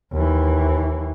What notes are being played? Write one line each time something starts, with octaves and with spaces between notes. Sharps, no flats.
D#2 E3